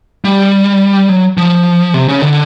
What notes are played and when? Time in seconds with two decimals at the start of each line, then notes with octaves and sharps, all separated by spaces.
0.25 G3
1.09 F#3
1.38 F3
1.94 C3
2.08 C#3
2.22 D3